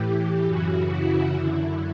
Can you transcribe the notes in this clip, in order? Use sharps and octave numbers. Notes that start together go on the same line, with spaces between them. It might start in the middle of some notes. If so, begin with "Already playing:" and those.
Already playing: A2 E3 G4
F#2 C#3 E3 F#4
E4
F#2 D3 E4